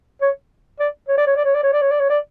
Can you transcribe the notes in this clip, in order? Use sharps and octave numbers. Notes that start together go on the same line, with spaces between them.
C#5
D5
C#5
D5
C#5
D5
C#5
D5
C#5
D5
C#5
D5
C#5
D5